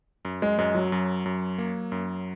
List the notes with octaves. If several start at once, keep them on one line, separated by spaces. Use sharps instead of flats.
F#2
G#3
F#2 G#3
F#3
F#2
F#2
A#3
F#2